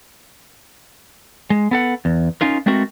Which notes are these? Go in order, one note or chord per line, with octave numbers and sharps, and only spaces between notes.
G#3
B3 A4 F#5
E2
C#4 D#4 F4 A#4
G#3 A3 C4 F#4 A#4